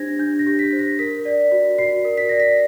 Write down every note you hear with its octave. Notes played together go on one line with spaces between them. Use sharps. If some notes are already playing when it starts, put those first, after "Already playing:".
Already playing: D4 G4 C5 G#6 A#6
D4 G6
A#6
G4
B6
C5
A#6
A#4 B6
D5
F#4
F#4 C7
A#4
B6
D5 A#6
B6